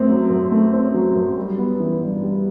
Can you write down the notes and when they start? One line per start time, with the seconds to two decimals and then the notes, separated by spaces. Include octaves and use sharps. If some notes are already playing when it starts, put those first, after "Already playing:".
Already playing: F#2 A3 C4
0.09 F#3
0.30 F#2
0.52 A3
0.73 C4
0.94 F#3
1.15 F#2
1.37 G3
1.58 B3
1.80 E3
2.01 G2
2.23 G3